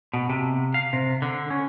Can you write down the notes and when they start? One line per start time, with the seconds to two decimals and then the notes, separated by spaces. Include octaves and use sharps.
0.13 B2
0.30 C3
0.74 F5
0.93 C3
1.22 D3
1.51 C#4